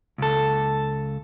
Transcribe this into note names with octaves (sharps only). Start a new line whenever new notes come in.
C#2 A4